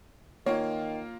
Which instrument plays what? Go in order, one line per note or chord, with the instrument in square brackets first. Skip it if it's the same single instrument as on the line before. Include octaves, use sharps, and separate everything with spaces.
[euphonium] D#3 [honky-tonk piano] A#3 F4 [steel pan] C#5